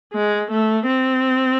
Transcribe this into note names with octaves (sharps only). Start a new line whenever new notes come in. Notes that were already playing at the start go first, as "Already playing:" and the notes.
G#3
A3
C4